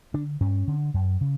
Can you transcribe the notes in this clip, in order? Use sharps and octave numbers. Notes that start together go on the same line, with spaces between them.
D3 D4
G2 C#4
D3
F#2
C#3